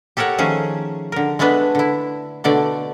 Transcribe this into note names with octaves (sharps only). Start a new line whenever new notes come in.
G4 A4 A#4 C#5 F#5
D#3 F3 A3 C#4 G#4
D3 A#4
G#3 A3 B3 D4 B4
D3 E4
B2 D3 A3 D5